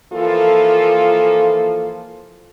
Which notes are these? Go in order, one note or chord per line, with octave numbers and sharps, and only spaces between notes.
E3 F3 A#3 F4 A4